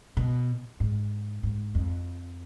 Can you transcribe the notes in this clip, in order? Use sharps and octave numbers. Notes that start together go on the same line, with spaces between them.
B2
G#2
G#2
F2